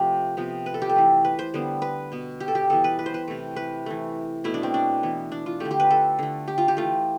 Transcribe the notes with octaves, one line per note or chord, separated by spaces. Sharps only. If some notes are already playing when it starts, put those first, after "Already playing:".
Already playing: C3 F3 A3 G4
C3 F3 B3
B4
A4
G4
A4
E3 A3
B4
C5
D3 G3 B3
B4
B2 B3
G4
A4
G4
E3 G3 B3 A4
B4
B4
C5
B4
C3 E3 A3
B4
E3 A3
B2 A3 E4
D4
C4
D4
E3 B3
D4
F4
D3 A3 G4
G4
B4
A4
D3 A3
G4
F4
G4
E3 A3 F4